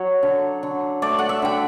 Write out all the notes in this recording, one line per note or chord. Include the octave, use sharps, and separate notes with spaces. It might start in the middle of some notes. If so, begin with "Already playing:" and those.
Already playing: F#3 C#5
D3
D3
A3 D5
F#5
E5
D3 G5